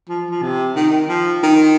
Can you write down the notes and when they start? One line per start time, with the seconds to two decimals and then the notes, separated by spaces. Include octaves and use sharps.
0.09 F3
0.31 F3
0.42 C3
0.76 D#3
1.09 F3
1.43 D#3